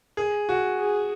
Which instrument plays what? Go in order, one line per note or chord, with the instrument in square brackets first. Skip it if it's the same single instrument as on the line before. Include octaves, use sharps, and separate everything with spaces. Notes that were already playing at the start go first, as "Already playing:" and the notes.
[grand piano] G#4
F#4
[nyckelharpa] G#4